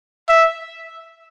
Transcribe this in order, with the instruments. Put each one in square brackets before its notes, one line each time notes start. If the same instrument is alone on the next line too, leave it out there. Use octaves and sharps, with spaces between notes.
[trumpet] E5